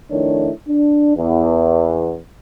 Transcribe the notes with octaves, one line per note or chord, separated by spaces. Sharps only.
F2 D#3 A3 D4 E4 C#5
D4
E2